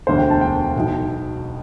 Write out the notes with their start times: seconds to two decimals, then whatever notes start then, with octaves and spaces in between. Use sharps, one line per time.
0.07 E1 D2 D3 C5
0.18 G5
0.30 A5
0.41 G5
0.76 B1 B2